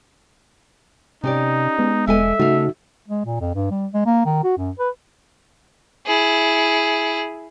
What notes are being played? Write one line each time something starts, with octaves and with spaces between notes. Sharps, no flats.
C3 C#4 D#4 G4 D5
G#3 B3
E1 G#3 A4 E5 G#5
C#3 A3 D#4 F#4 F5
G#3
A#2
F2
G2
G3
G#3
A#3
D#3
F#4
F#2
B4
E4 G#4